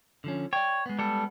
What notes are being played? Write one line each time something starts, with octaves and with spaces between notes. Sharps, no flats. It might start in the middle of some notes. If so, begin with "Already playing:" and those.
D3 F3 C#4
C#5 D5 G5
G#3 B3
G3 A4